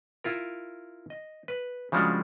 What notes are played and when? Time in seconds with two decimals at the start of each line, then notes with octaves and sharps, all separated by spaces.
0.24 E4 F4 A#4
1.10 D#5
1.48 B4
1.92 C#3 F3 G3 G#3 D4 F#4